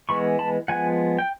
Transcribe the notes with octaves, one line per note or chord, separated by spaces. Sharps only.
E3 G#3 B3 B5 C#6
A5 B5
F3 G#3 B3 F#5 G#5
G5